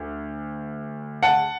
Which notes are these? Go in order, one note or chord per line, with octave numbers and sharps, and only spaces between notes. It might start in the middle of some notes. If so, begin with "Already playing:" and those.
Already playing: D2
F#5 A5